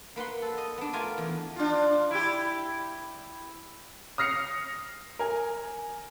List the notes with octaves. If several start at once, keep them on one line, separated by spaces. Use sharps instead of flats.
A#3 B4 F#5 C6
A4
D#5
B3 D4
A3 F4 A#4 G#5
E2
D4 F4
E4 G4
D#6 F6 A#6 C7 C#7 F7
A#4 G#5